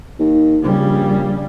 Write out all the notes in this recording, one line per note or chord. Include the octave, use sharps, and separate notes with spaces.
D#2
A#1 C#3 G3